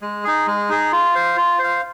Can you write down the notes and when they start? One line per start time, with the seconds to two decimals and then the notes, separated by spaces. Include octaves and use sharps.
0.02 G#3
0.24 D#4 G#4
0.47 G#3
0.69 D#4 G#4
0.92 F4
1.15 C5 F5
1.36 F4
1.59 C5 F5